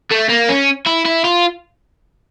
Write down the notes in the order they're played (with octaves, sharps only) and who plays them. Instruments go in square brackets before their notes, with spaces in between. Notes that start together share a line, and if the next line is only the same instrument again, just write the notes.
[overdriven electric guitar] A3
A#3
C#4
E4
E4
F4